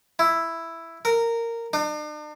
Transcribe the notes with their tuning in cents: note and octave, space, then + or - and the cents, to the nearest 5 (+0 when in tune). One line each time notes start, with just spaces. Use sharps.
E4 +5
A#4 -15
D4 +45